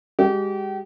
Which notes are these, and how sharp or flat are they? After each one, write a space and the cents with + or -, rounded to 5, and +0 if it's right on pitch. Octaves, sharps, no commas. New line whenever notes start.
G#3 -30 G4 -35